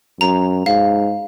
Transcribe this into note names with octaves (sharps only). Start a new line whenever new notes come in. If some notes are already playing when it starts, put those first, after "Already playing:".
F#2 A#5
G#2 F5